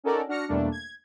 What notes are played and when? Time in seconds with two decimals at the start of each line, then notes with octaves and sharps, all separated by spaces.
0.04 C#4 D#4 F#4 A4 A#4 D5
0.28 D4 F#4 F6 A#6 C#7
0.48 E2 B2 G3 A3 A#3 D4
0.72 G#6